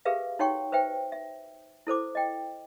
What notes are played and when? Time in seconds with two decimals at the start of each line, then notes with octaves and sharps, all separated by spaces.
0.05 G4 G#4 A#4 B4 E5 F5
0.39 D#4 F#4 C#5 F#5 G5 C#6
0.72 B4 C5 E5 G5
1.12 E5
1.87 E4 A4 C5 D6
2.15 D#5 G5